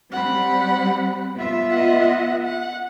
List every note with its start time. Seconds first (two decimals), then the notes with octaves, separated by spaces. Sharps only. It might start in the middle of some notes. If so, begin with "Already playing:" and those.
0.12 G3 C4 F#5 B5
1.37 B3 F4 E5
1.71 D#5 F#5
2.45 F#5